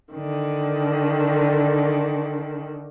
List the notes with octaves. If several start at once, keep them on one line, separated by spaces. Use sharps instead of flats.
D3 D#3